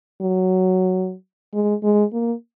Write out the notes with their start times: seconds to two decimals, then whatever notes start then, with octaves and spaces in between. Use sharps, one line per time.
0.21 F#3
1.54 G#3
1.83 G#3
2.13 A#3